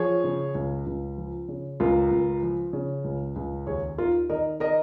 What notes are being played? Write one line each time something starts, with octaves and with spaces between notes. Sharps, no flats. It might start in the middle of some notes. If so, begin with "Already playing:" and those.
Already playing: F3 G#4 C#5
C#3
C#2
C#2
F3
C#3
C#2 F4 A#4
C#2
F3
C#3
C#2
C#2
D#2 G#4 C#5
D#3 F4 A#4
D#3 A#4 D#5
A#4 D#5